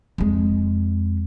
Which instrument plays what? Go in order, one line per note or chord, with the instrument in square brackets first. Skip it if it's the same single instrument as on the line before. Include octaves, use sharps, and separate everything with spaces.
[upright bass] F2 G#3